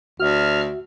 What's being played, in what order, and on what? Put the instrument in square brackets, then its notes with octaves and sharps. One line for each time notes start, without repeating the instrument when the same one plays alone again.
[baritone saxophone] D2 [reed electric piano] F#4 E5 [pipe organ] F6